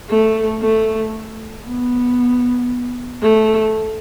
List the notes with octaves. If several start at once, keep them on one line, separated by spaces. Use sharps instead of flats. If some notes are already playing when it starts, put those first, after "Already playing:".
A3
A3
B3
A3